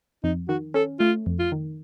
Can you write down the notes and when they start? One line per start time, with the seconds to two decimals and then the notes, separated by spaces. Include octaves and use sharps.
0.24 F2 D#4
0.49 D#3 F#4
0.74 C#4 A4
1.00 A3 F4
1.26 F2
1.39 F4
1.52 D#3